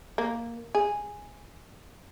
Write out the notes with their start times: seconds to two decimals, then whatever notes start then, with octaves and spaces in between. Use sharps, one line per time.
0.18 A#3
0.75 G#4